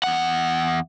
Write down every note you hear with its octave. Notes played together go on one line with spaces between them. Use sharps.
E2 F#5